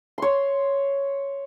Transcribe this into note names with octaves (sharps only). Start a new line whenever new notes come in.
C#5 C6